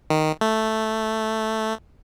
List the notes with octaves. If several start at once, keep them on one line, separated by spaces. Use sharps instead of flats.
D#3
A3